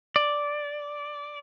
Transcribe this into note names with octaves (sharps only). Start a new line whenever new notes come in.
D5